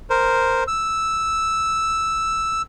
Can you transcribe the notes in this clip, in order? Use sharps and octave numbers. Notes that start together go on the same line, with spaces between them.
A#4 C5
E6